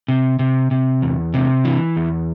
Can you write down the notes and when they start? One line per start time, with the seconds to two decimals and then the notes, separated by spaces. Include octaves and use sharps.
0.08 C3
0.39 C3
0.71 C3
1.02 E2
1.34 C3
1.65 E3
1.97 E2